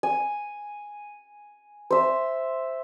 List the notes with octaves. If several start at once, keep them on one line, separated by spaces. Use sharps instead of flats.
G#5
C5 E5